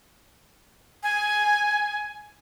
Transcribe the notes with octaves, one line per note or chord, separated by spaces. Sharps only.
G#5